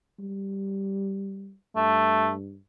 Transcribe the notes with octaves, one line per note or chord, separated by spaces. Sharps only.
G3
G2 A3